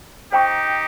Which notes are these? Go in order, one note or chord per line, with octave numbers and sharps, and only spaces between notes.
D#4 G4 C5 G5 A#5 C#6